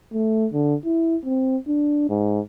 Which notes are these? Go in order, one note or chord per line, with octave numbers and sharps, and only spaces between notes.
A3
D3
E4
C4
D4
G#2